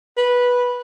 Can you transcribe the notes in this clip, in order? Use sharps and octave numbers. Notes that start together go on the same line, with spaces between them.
B4